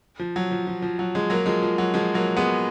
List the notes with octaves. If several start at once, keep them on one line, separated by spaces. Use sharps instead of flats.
F3
F#3
F3
F3
F3
F#3
F3 G#3
F#3 A#3
F3 G#3
F3
F#3
F3 G#3
F#3 A#3
G#3 B3